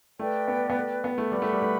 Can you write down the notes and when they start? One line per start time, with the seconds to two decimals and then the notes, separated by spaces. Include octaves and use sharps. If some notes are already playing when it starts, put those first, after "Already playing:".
0.19 A3 B4 D5 G5
0.48 B3
0.70 B3
0.75 A3
1.04 B3
1.18 A3
1.31 G3 B4 F#5 B5
1.42 A3
1.53 G3
1.62 A3